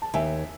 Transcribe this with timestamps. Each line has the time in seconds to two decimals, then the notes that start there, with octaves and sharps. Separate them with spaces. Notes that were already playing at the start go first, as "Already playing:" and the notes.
0.02 A5
0.14 D#2 E5 G#5